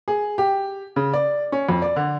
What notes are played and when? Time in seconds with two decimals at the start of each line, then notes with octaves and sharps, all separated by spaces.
0.08 G#4
0.38 G4
0.96 C#3
1.14 D5
1.52 C#4
1.69 F2
1.82 D5
1.96 D3